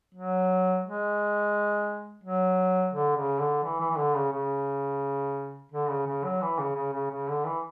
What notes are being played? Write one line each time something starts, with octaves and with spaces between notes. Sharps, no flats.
F#3
G#3
F#3
D3
C#3
D3
E3
E3
E3
D3
C#3
C#3
D3
C#3
C#3
F#3
E3
C#3
C#3
C#3
C#3
D3
E3